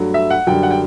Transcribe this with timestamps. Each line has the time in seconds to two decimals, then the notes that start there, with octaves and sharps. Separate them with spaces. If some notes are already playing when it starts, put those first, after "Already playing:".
Already playing: G2 F#3 A3
0.14 E5
0.30 F#5
0.47 F#2 D3 G3 G5
0.63 F#5
0.71 G5